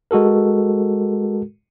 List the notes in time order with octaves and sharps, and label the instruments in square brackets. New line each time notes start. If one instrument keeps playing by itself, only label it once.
[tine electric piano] G#3 F#4 A4 A#4